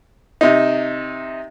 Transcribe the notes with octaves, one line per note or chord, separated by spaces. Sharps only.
C3 D#4